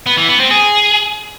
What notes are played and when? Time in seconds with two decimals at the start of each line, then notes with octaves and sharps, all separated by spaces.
0.06 B3
0.17 E3
0.28 B3
0.39 C4
0.51 G#4